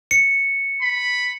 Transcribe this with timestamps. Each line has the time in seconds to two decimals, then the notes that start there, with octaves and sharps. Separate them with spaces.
0.11 C#7
0.82 B5